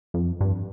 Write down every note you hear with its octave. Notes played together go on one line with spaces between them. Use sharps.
F2
G2